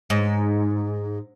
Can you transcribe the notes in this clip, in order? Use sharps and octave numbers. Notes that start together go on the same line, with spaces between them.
G#2